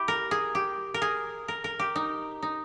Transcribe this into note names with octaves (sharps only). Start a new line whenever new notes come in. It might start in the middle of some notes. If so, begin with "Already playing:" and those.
Already playing: E4 G4
A#4
G#4
G4
A#4
G#4
A#4
A#4
G4
D#4
D#4